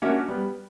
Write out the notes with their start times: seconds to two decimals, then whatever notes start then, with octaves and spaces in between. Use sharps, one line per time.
0.02 A#3 C#4 D4 F#4 C#5 E5
0.28 G3 B3